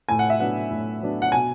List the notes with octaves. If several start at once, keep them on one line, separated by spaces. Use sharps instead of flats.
A2 G#5
F#5
E5
F#3 B3 D4 F#5
A2
F#3 B3 D4
F#5
B2 G#5